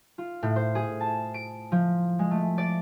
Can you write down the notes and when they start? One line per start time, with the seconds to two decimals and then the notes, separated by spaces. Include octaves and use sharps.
0.18 F4
0.43 A2
0.56 C5
0.75 G#4
1.01 A5
1.34 D7
1.72 F3
2.19 G#3
2.31 A3
2.58 D5